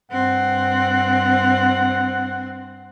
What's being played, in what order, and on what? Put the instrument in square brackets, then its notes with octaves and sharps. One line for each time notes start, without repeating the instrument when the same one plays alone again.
[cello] G2 C4 [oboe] F#5